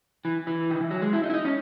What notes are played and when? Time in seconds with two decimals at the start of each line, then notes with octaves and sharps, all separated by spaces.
0.25 E3
0.47 E3
0.71 D#3
0.81 E3
0.91 F#3
1.02 G#3
1.13 E4
1.23 D#4
1.30 E4
1.34 D#4
1.45 C#4